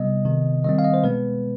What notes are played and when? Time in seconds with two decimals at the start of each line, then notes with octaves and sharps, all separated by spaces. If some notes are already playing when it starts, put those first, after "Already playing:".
Already playing: C3 G3 B3 D#5
0.25 C3 D#3 B3
0.64 D#3 G3 C4 D#5
0.79 F5
0.84 D#5
0.94 C5
1.04 B2 G#3 B3 B4